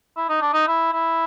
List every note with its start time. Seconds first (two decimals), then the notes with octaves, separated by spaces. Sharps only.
0.17 E4
0.29 D#4
0.41 D4
0.53 D#4
0.67 E4
0.93 E4